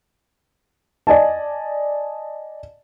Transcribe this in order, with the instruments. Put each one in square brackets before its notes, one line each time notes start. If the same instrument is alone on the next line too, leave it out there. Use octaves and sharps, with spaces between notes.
[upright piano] D5 D#5 G#5 A5